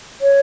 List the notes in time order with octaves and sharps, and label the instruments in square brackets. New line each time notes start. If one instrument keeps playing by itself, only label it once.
[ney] C#5